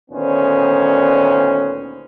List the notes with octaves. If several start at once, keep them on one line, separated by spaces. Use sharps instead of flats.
D2 A#2 D#3 B3 C#4 C5